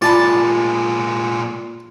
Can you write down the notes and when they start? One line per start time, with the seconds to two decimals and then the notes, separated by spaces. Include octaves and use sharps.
0.02 A#2 G#3 F4 D5 A5 B5